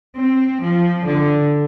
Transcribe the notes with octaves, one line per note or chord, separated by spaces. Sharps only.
C4
F3
D3